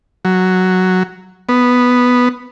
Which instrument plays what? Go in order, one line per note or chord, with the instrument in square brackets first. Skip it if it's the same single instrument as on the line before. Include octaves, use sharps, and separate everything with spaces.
[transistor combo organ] F#3
B3